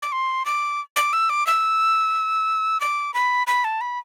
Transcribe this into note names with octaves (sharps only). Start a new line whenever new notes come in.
D6
C6
D6
D6
E6
D6
E6
D6
B5
B5
A5
B5